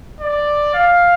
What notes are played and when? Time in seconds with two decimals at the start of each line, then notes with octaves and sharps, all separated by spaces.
0.20 D5
0.74 F5